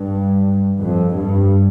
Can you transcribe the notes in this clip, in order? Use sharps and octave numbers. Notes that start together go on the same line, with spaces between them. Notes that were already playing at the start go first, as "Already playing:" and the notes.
Already playing: G2
F2
G2